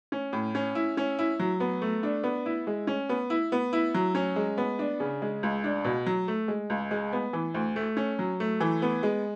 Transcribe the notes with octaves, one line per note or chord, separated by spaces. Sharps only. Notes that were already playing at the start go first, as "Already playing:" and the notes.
C#4
A2
C#4
E4
C#4
E4
F#3
B3
A3
D4
B3
E4
G#3
C#4
B3
E4
B3
E4
F#3
C#4
G#3
B3
D4
C#3
G#3
C#2
D4
B2
F#3
A3
G#3
C#2
G#3
B3
E3
D2
A3
C#4
F#3
A3
E3
B3
G#3